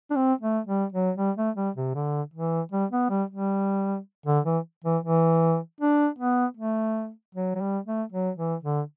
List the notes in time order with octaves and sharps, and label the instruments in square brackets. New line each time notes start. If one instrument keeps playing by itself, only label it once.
[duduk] D4
C4
A3
G3
F#3
G3
A3
G3
C3
D3
E3
G3
B3
G3
G3
D3
E3
E3
E3
D4
B3
A3
F#3
F#3
G3
A3
F#3
E3
D3